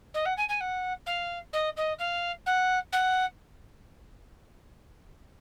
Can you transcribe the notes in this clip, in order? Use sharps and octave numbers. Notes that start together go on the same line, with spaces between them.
D#5
F#5
G#5
G#5
F#5
F5
D#5
D#5
F5
F#5
F#5